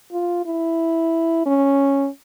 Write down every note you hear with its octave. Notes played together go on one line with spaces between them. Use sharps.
F4
E4
C#4